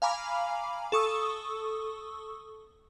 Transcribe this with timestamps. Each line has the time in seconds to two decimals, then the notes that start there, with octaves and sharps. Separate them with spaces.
0.02 F5 G#5 A#5 B5 D6 F6
0.92 A4 C#6 D#6 E6